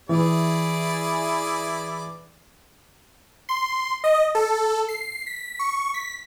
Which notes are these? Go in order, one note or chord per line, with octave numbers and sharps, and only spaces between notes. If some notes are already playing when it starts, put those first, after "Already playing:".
E3 E4 G#4 D5
C6
D#5
A4
C7
B6
C#6
B6